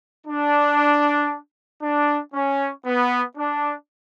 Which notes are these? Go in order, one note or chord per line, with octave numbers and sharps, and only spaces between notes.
D4
D4
C#4
B3
D4